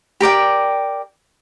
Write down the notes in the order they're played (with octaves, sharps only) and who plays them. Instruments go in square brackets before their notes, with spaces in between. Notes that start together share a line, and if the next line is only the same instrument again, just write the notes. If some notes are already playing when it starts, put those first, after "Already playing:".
[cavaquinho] G4 A#4 D5 G5